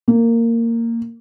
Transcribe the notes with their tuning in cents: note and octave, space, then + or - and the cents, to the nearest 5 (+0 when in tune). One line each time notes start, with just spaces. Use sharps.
A#3 -15